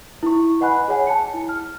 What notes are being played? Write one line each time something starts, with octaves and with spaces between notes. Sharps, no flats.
E4 C#6
B4 D#5 F#5 G#5 B5 F#6
G#4 C#5 F#5 G#5
A5 C#7
E4
F6